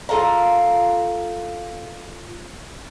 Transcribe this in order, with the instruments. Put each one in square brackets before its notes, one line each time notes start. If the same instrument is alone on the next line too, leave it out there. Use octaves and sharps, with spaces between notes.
[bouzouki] F4 A4 F5 A#5